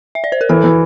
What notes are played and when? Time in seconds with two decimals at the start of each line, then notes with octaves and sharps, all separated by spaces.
0.15 E5
0.24 D5
0.32 C5
0.41 A#4
0.49 E3 A4
0.64 E3